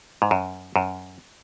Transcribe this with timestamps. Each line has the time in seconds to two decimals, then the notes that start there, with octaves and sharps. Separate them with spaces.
0.22 G#2
0.31 F#2
0.76 F#2